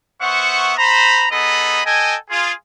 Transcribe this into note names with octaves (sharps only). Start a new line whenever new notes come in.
B3 C5 E5 F#5 C#6
C5 A#5 B5
B3 D#4 G#4 A4 D#5 B5
A4 D#5 G5 G#5
F4 G#4